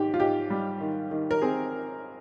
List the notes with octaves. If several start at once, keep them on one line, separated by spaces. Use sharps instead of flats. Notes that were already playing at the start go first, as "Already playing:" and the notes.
Already playing: G#2 D#3 G4
F4
G#2 G4
G3
D#3
D#3
A#4
C4 G#4